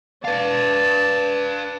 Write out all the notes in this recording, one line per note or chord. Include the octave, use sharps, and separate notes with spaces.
B4 D5 F5 A5